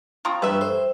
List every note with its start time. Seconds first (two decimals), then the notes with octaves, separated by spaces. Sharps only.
0.25 F3 C4 F4 A#5 C#6 D#6
0.42 G2 B4 E5
0.61 A4 C5